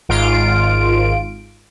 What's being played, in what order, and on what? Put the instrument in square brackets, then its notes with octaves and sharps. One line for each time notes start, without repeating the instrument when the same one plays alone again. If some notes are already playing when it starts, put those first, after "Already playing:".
[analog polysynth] G#1 G#2 F4 D7